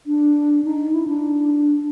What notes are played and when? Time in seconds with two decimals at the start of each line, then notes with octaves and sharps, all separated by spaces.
0.06 D4
0.64 D#4
0.93 E4
1.08 D4